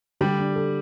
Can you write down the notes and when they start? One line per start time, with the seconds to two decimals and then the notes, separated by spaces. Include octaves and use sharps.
0.21 D3 G3
0.39 D4
0.55 A4